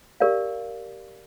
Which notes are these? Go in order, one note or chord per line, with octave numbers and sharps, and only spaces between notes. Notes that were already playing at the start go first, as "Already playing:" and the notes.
G4 A#4 D5 F5